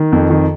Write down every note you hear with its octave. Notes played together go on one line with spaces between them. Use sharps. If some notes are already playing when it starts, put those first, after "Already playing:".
Already playing: D#3
F2
D#3